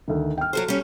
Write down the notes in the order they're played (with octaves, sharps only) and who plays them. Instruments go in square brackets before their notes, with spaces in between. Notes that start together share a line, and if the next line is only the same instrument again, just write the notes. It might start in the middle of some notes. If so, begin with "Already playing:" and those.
[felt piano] D2 D#3
G5 F6
[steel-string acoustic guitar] F#3 F#4 C5 [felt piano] A4
[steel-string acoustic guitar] G3 C#4